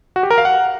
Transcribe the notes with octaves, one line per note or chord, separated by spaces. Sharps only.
F#4
G4
A#4
F5
F#5